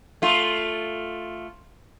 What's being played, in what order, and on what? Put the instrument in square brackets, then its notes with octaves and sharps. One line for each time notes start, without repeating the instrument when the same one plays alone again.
[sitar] A3 F4